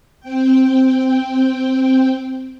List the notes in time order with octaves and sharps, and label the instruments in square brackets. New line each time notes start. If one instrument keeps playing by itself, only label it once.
[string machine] C4 G5